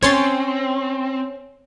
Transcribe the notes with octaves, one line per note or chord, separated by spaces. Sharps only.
C4 C#4 C5 C#5 C6 A6